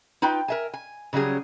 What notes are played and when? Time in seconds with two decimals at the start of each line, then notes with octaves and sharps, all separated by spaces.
0.22 D#4 F4 B4 G5
0.48 A#4 E5 G#5
0.74 G#5
1.13 C#3 F#3 G3 C#4 G#4